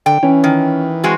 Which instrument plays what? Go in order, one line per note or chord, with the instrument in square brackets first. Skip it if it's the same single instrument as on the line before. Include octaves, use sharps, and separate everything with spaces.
[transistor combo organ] D3 [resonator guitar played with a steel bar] G5
[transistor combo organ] E3 [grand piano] C#4
[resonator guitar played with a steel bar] D#3
G#3 C4 F#4